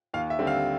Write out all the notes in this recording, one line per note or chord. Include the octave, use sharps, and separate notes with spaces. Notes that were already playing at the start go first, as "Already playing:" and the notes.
D#2 F5
E5
D3 G3 C4
F5